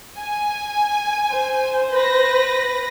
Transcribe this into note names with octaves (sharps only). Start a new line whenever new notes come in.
G#5
C5
B4 A#6